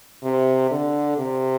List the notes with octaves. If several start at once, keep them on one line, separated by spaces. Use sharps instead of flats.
C3
D3
C3